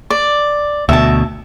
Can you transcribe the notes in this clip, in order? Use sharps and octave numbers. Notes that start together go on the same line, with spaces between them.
D5
D2 B2 E5 A5